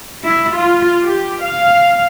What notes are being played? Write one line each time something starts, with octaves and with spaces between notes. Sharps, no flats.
E4
F4
G4
F5